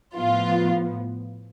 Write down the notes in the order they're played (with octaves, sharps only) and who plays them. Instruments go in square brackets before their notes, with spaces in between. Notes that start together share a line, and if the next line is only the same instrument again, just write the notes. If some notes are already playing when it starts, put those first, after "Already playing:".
[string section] A2 F3 B3 F4